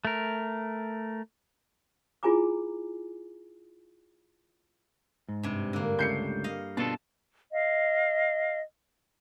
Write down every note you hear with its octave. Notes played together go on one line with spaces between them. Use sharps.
A3 A#4
E4 F4 G#4 G#5 A#5 D6
G#2
G2 C3
D3 A#3
C#2 A3 G6 C7 C#7
D#5 F5
B2 D4 F4 A4 A5
D#5 F5